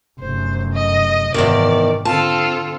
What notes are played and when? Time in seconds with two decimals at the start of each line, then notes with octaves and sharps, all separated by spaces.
0.20 F1 F#2 C5
0.73 D#5
1.34 G#1 E2 C3 D#3 D5
2.05 D3 C4 F4 A4 A5